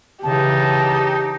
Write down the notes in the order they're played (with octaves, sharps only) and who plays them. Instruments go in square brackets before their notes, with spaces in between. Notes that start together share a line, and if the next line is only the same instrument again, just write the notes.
[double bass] C#3 E3 [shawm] D#4 [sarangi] G4 [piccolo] A5